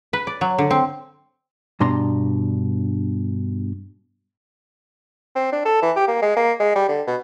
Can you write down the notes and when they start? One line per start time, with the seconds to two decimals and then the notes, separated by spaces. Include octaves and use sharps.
0.13 B4
0.27 D5
0.41 F#3
0.58 D3
0.71 C4
1.80 G2 B2 D4 A#5 C6
5.36 C4
5.52 D4
5.65 A4
5.82 E3
5.96 G4
6.08 A#3
6.22 G#3
6.37 A#3
6.60 G#3
6.76 G3
6.88 D3
7.07 B2